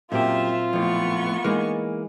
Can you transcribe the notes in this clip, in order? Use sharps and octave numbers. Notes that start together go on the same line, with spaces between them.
F#2 A#2 F#3 C4 F4 G4 E5
F2 A2 A3 B3 C#6
E3 G#3 A#3 D#4